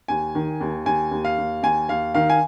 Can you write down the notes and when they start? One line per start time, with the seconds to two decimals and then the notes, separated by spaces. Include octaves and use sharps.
0.08 D#2 G#5
0.35 D#3
0.61 D#2
0.86 D#2 G#5
1.11 D#2
1.25 F5
1.38 D#2
1.63 D#2 G#5
1.89 D#2 F5
2.14 D#3 F5
2.30 G#5